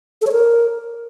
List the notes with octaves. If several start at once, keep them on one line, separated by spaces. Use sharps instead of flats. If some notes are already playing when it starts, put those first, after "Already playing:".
A4
C#5
A#4